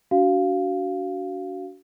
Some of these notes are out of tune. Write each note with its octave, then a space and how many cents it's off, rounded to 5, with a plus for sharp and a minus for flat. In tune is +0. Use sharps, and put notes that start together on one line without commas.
D4 -35 F#4 +15 F5 +0